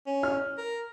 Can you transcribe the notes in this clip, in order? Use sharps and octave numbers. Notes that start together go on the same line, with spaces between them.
C#4
F6
A#4